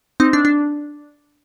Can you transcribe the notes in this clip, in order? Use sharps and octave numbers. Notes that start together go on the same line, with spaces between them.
C4 D#4
D4
D4